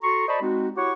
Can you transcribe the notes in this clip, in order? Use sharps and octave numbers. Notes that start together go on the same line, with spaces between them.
F#4 A4 A#5 C6 C#6
C5 D5 D#5 A5 B5 C#6
G#3 C4 D#4 F#4
E4 F#4 G4 C#5 F#5 C#6